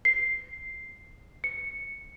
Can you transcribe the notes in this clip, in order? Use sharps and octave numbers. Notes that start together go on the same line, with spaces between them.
C7
C#7